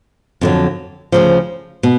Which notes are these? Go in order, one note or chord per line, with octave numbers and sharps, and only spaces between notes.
F2 D3 F#3
D2 C#3 F3
B2